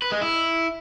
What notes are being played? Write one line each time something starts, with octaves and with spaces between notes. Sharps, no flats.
B4
G#3
E4